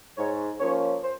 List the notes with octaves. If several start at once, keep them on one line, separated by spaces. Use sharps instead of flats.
G#2 C#5
F3 A#3 C#4 C#5
C5